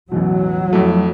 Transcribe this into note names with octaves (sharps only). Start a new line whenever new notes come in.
A1 E2 B2 F#3
F2 A3 E4